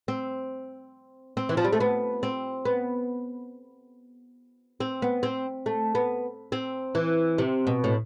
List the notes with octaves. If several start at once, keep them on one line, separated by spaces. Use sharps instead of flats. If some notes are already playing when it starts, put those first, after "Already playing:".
C4
C4
E3
F3
G3
A3
B3
C4
B3
C4
B3
C4
A3
B3
C4
E3
C3
B2
A2